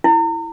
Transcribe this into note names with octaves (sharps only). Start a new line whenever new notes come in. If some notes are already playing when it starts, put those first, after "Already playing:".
E4